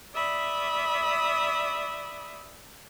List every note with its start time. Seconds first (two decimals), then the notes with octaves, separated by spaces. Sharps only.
0.14 D5 E5 B5 D#6